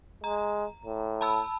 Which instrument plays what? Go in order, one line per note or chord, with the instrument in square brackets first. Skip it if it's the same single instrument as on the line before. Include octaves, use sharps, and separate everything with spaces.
[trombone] G#3 [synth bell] A#5
[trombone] A2
[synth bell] A5 B5 E6